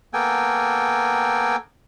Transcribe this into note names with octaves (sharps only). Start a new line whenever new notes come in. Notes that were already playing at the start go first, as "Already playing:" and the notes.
A#3 B3 A4 G5 G#5